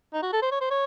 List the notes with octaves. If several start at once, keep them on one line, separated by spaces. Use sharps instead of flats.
D#4
F#4
A4
C5
C#5
C5
C#5